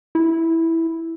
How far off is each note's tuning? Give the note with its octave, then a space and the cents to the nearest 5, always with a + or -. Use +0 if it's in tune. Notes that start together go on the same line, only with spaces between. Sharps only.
E4 -5